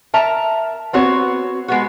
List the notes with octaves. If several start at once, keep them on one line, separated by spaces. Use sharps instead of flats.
A#4 E5 A5 A#5
B3 C4 F#4 C#5
G#3 B3 F#4